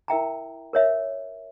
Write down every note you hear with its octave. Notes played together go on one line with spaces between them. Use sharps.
E4 A#4 E5 G5 A#5
A#4 C#5 E5